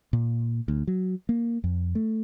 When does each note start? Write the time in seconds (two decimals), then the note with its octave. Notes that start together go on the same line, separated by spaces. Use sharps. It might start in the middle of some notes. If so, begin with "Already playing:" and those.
0.13 A#2
0.68 D2
0.87 F#3
1.29 A#3
1.64 F2
1.95 A3